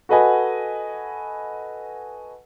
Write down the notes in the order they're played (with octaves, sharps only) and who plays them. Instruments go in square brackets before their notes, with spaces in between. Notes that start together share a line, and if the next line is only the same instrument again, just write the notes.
[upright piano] F#4 A4 B4 D#5 F#5 G#5